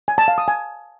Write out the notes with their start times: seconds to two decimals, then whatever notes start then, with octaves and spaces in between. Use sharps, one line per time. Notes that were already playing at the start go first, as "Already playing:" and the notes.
0.08 G#5
0.18 A5
0.28 F5
0.38 D#6
0.48 G#5